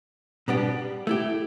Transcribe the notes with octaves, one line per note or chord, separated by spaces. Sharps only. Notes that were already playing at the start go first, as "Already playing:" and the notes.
B2 G3 B3 D4 G4
A3 E4 G4